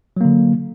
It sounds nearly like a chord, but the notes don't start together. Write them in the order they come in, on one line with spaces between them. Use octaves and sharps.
F#3 A#3 D3